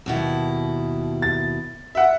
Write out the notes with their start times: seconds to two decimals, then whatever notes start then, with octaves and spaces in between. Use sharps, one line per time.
0.06 D#2 B2 E4
1.22 A6
1.95 E5 F#5